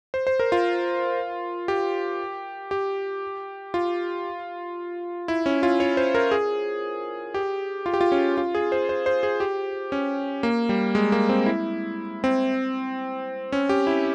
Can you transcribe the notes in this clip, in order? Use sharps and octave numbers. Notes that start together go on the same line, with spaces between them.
C5
C5
A#4
F4
G4
G4
F4
E4
C#4
F4
C#5
C5
A#4
G#4
G4
F4
G4
F4
C#4
F4
G#4
C5
C5
C5
G#4
G4
C#4
A#3
G3
G#3
A#3
C4
E4
C4
C#4
G4
E4